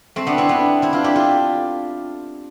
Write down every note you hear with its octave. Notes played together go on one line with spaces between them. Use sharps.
A3 C4
B3 D4
C4 E4
B3 D4
C4 E4
D4 F4
E4 G4
F4 A4